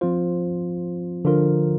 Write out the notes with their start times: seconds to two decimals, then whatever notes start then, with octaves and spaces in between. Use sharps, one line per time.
0.01 F3 C4 F4 C5
1.25 D3 F3 D4 F4 A#4